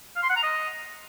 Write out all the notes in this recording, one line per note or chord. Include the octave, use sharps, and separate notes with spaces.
F5
C6
F#5
A#5
D#5